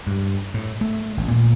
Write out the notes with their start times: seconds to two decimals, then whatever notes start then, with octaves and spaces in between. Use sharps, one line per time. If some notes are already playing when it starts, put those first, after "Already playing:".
0.07 G2
0.54 A2
0.81 A3
1.17 A1
1.31 A#2